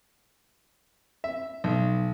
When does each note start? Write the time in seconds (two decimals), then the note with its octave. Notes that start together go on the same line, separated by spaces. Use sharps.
1.24 E5
1.64 B1